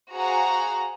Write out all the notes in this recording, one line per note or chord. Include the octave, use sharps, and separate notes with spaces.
F#4 G#4 C5 F5 F#5 A#5